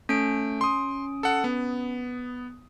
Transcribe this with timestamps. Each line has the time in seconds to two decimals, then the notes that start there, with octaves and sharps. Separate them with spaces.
0.09 A3 C#4 D7
0.61 C6 D#6
1.23 A4 F#5
1.44 B3